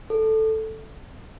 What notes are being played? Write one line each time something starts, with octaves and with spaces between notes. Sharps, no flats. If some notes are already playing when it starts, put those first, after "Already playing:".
A4